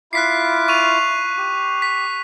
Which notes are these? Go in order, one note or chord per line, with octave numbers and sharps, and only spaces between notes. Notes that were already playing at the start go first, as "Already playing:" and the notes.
E4 F4 D6 F#6 B6 C7
C#6 D#7 F7
G4
B6